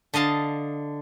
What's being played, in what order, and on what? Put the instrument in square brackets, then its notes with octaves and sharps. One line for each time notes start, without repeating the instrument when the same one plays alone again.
[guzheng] D3 D#5 F5 A5